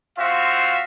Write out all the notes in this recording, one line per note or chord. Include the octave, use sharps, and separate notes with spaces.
C4 F4 F#4 E5 F5